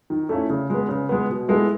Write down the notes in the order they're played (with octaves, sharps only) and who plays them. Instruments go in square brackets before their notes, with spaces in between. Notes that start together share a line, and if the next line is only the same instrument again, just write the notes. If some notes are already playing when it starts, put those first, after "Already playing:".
[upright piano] D#3
A3 C#4 E4
C#3
G#3 B3
C#3
G#3 B3
B2
G#3 B3 E4 A4